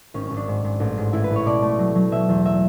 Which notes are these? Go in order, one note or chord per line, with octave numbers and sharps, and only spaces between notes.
G#1 C#4
C#4
G#1
D4
G#2
G#2
A1
G#2
A1 E4
B4
A1
C#5
B2 D5
A3
F#3
F#3
B2 E5
E2
F#3 E5